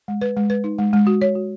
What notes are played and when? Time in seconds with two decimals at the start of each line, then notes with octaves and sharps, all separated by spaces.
0.08 G#3
0.21 B4
0.37 G#3
0.50 B4
0.64 D#4
0.78 G#3
0.93 G#3
1.07 F#4
1.21 C#5
1.35 F#4